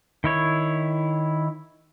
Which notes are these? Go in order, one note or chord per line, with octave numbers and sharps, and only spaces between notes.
D#3 E4 C#5